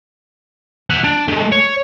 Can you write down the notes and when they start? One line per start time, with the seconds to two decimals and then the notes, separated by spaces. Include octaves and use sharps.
0.90 E5 F#5
1.04 D4
1.28 G#3 A3
1.52 C#5